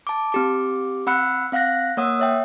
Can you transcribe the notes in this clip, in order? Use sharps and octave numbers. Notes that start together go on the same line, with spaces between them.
A5 D6
C4 G4 D6
C4 F#5 B5 E6 F#6 C#7
C4 F5 F#5 F#6 A#6
A#3 C#5 F#5 D#6 E6
C#5 E5 G5